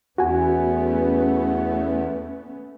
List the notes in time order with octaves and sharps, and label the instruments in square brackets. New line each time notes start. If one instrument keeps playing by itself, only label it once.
[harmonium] E2 [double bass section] A3 B3 C#4 [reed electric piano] F#4 G#5